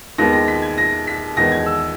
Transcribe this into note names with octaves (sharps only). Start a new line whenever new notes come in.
D#2 D#3 G#3 B3 A#6
A#6
B6
G#6
A#6
B6
E2 D#3 G#3 B3 A#6
G#6
E6